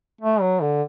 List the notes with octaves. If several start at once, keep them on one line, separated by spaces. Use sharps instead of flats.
A3
F#3
D3